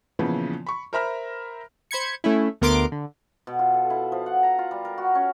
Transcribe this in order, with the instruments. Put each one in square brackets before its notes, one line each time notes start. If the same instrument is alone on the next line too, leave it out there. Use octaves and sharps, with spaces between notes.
[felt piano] A#2 C#3 E3 F3 B3
B5 C#6
A#4 C5 E5 A#5 B5 F6
[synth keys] C5 B5 G#6 C#7
A3 C#4 E4
D2 B3 A#4 C6 D6 D7
D3
[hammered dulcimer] B2
F4
A4
E4
F3
F#5
A#5
F4
G3
A#4
F#4
C#4